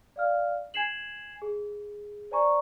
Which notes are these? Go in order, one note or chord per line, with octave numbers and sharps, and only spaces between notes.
D5 F5 F6
G#5 G#6 C7 E7 F#7
G#4
C5 D5 G#5 A#5 C#6